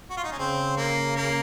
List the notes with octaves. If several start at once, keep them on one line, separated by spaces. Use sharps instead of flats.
F#4
F4
D#4
C#4
C#3 C4
A#3
A#3